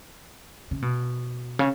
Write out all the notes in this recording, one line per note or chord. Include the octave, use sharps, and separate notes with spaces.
C#3
B2
C#3